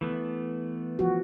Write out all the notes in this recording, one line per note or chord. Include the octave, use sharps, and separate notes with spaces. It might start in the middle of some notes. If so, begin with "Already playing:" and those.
E3 A3 B3
F3 F#4